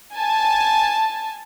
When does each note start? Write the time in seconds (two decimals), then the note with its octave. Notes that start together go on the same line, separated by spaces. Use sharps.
0.14 G#5 A5